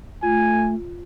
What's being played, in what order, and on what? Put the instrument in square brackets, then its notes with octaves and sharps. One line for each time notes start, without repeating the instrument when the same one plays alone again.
[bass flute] A3 [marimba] F4 [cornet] G#5